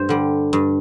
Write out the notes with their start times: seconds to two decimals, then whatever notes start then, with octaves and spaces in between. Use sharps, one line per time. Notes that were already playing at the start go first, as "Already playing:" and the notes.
Already playing: G2 C5
0.09 D3 G3
0.53 G2